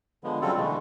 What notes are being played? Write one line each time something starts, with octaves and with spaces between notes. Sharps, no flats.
D3 F3 G#3 B3
C#3 F#3 G3 C4 F4 A4
B2 D3 E3 G#3 A3 B3